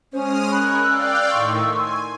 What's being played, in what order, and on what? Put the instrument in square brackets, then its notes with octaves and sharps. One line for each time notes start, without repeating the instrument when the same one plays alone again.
[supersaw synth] G#3 D#6 F6 [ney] C#4 [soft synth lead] C5
[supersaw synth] A#4 C#5 [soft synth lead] B5 [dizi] F#6
[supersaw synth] D5 F5 G5 [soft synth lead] E6
[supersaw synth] A2 D#3 [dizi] C6 [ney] C#6
[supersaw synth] G#5